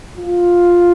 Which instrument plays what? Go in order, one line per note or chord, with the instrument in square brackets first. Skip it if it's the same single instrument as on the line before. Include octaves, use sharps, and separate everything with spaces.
[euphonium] F4